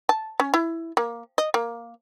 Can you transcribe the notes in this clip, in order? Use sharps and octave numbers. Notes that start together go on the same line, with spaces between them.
A5
C#4
E4
A#3
D#5
A#3